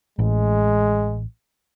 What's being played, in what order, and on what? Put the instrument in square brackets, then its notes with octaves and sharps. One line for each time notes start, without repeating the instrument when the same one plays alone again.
[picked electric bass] A1 [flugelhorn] G#3